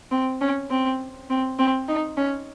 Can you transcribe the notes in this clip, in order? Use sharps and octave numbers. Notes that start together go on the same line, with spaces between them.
C4
C#4
C4
C4
C4
D#4
C#4